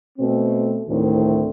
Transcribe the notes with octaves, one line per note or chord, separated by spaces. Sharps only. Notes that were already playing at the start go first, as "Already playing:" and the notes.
B2 A3 C4
D2 A2 D#3 C4